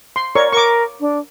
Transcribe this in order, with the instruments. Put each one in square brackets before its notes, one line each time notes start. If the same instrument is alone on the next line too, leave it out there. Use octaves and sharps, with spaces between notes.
[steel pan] C6
[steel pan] A#4 C#5 C#6 [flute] D5
[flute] A#4 [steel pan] C#6 D6
[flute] D4